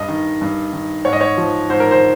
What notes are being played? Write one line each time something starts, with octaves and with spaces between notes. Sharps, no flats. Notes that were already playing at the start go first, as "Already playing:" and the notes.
Already playing: G2 D#5
D#3
G2
D#3
G#2 C#5
D#5
C#5
F3
G#2 C5
A#4
C5